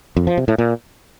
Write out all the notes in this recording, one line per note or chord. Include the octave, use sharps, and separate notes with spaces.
F2
F3
C3
A2
A#2